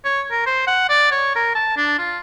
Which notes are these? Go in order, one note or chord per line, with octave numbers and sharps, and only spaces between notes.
C#5
A#4
C5
F#5
D5
C#5
A#4
A5
D4
F4